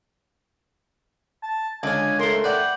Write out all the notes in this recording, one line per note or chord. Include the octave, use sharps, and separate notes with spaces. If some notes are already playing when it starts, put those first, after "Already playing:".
A5
C#2 D3 C#4 G#5
A3 A#4 C6
B4 D5 F#5 G5